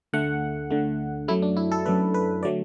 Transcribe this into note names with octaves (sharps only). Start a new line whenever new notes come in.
D2 D3 A3 F#5
D2 D3 A3
F#2 F#3 A3 E4
D4
E4
A4
F#2 F#3 A3 B4
B4
D3 F#3 A3 D5